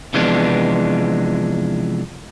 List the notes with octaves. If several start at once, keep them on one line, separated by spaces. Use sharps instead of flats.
C3 E3 F3 G#3 B3 D4